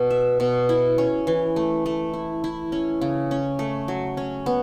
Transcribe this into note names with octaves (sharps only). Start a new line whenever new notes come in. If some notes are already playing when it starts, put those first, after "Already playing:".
Already playing: B2
E5
B2
E4
C#4
E3
A3
A3
E4
E4
C#4
C#3
C#4
A3
F#3
C#4
B3